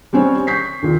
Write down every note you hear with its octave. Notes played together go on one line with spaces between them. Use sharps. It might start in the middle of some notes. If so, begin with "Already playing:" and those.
G3 C4 C#4 C5 C#5
C#6 G6 B6 C7
D#2 A#2